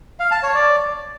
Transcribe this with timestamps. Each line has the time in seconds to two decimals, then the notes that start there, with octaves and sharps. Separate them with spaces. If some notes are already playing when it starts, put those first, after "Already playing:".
0.20 F5
0.31 A5
0.43 C#5
0.54 D5